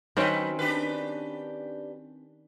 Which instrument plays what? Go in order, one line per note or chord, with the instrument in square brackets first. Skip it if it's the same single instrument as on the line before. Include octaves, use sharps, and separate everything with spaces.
[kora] D#3 C4 C#4 [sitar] F#3 B4
[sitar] D4 G4 B4